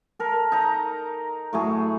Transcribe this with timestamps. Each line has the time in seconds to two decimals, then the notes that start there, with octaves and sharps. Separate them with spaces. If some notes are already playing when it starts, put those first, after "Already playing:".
0.19 A4 A#4
0.52 D#4 A#5
1.53 A2 F#3 A3 G#4